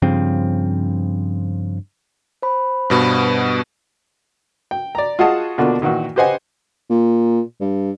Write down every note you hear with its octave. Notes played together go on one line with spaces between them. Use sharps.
G2 C#3 F3 C4
C5 B5
G2 B2 B3
G5
D5 A#5
F4 F#4 G#4 D#5 F#5 A5
B2 D3 A#3 D4 F4 F#4
A#2 D#3 E3 F#4
G4 B4 C5 D#5 F#5 G#5
A#2
G2